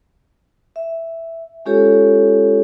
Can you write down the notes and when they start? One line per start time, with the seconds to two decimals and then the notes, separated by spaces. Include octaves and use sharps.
0.76 E5
1.65 G#3 C#4 F4 G4 A4 C#5